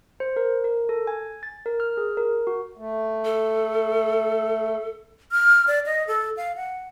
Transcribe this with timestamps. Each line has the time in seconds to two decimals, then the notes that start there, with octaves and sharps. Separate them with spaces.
0.20 C5
0.36 A#4
0.64 A#4
0.89 A4
1.07 G#5
1.43 A6
1.66 A#4
1.80 F6
1.97 G#4
2.17 A#4
2.47 F#4
2.77 A3
3.25 A4
5.31 F6
5.67 D5
5.86 D#5
6.07 A4
6.37 F5
6.56 F#5